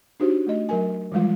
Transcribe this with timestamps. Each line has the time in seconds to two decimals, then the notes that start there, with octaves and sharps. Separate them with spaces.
0.20 D4 D#4 F#4 G4 C5 C#5
0.47 A3 D#5
0.69 F#3 A#4 G#5
1.12 E3 F3 G3 G#3 F4